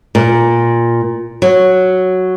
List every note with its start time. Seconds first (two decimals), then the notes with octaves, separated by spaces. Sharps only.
0.15 A#2
1.42 F#3